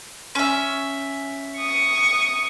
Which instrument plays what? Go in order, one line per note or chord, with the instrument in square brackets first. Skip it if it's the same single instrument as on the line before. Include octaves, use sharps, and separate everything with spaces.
[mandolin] C#4 E5
[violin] C#6 D#6